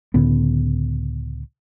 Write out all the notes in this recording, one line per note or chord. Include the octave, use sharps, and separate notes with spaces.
C#2 A2 D3 B3